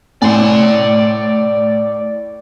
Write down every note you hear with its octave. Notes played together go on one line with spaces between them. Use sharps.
A2 D5 C6